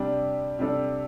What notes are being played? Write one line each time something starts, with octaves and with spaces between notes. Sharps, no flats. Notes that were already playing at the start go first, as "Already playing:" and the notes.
Already playing: C3 G3 D4
C3 G3 D4 A4